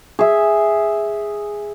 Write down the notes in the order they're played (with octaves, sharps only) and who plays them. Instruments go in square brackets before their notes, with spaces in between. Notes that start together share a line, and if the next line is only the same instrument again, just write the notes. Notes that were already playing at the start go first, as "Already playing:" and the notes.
[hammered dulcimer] G#4 E5